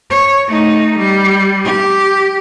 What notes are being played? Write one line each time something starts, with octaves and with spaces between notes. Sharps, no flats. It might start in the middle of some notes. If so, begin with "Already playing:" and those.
C#5
A3 D#4
G3
G4